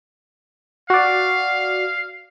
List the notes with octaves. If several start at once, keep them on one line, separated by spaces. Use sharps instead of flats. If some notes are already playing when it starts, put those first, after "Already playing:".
F#4 D5 F5